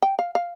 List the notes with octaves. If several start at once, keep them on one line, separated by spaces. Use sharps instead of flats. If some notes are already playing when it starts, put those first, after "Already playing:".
G5
F5
F5